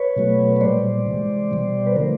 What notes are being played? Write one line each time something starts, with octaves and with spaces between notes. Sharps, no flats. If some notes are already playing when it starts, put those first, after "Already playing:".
Already playing: B4 C#5
B2 F#3 A3
C#5
A#2 G3 C5 D5
C3 E3 G#3
B2 G3
B4
D3 F3 A3 A#4 C5